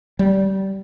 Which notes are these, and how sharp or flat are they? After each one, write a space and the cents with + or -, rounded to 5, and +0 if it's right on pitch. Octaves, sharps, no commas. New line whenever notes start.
G3 -25